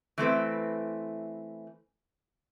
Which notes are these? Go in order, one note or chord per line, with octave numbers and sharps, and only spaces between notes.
E3 A3 C4 B4